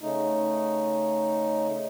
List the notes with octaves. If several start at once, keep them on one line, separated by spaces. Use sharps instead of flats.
C#3 A3 D#4